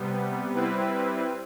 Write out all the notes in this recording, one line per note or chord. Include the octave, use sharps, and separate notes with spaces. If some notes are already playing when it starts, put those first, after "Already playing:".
Already playing: C3 G3 B3
G3 C4 E4 B4